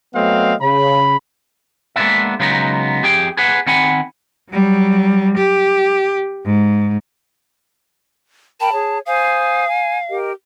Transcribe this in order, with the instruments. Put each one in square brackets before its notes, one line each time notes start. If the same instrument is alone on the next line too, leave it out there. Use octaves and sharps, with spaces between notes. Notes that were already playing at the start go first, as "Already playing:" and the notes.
[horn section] F#3 A3 B3 C4 D#5 F5
C#3 B5
[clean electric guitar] G#3 A#3 B3 C#4 D4 E5
C#3 F#3 G#3 B3 D#4
F2 G4 G#4 G5
G#4 B4 F#5
D#3 C4 F#5 G#5 B5
[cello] F#3 G3
G4
G#2
[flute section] A#4 G5 B5 [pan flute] A5
[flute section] G#4 C#5
[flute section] C5 G#5 D#6 [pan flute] F5
[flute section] G#5
G4 A#4 D#5